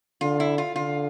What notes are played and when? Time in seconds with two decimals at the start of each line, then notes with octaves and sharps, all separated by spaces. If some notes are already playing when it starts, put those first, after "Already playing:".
0.21 D3 F4
0.40 E4
0.58 F4
0.76 D3 F4